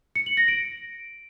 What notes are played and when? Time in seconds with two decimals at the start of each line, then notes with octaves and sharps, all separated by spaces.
0.15 C#7
0.26 F#7
0.37 A#6
0.48 D7